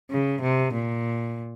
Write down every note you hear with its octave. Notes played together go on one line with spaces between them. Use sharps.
C#3
C3
A#2